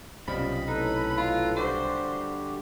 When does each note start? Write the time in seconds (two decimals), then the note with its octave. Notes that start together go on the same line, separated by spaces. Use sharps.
0.28 B1 C3 F3 G3 C#4 D#5 B5
0.68 A2 D#4 A4 B4
1.18 F4
1.57 D3 G3 F#4 G4 C5